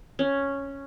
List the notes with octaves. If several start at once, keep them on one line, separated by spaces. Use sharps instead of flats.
C#4